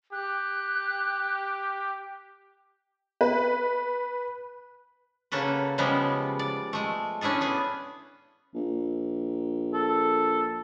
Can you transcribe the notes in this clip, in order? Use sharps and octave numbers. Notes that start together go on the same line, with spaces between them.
G4 F#6
B4
C#3 A#3 F#4 A4 B4
C#3 F3 G3 G#3 B3
D5
G#3 A3
C#4 D4 E4 G#4 A4
B3 G#4
A#1
A4